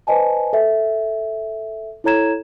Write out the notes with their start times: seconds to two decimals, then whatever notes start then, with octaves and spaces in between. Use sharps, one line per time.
0.07 B4 C5 D#5 G#5 A5
0.53 A4 E5
2.04 E4 A4 C#5 A#5 G#6 E7